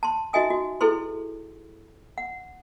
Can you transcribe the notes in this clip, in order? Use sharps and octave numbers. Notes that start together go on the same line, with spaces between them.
A5 C6
D#4 F#4 D#5 E5 G#5 D#6
F#4
E4 G#4 A4 B4 C6
F#5